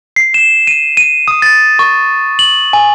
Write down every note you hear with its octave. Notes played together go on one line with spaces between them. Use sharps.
C7
E7
D#7
D#7
D#6
A6
C#6
F#7
G#5